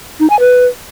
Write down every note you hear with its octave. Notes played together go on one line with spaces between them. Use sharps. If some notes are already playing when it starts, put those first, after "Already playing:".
D#4
G#5
B4